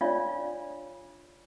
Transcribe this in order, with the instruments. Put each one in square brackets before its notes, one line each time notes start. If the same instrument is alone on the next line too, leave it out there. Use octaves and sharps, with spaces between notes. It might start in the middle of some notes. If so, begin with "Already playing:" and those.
[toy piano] D4 F4 C#5 D5 F5